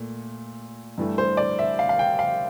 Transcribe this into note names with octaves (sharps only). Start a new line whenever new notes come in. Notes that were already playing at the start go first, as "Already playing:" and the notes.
Already playing: A#2 A3
G2 E3 A3
C5
D5
E5
F5
F5
G5
F5